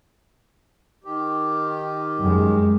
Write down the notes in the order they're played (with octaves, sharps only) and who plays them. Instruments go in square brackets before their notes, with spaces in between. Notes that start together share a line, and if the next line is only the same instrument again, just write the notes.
[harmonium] D#3 G4
[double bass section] F#2 G#3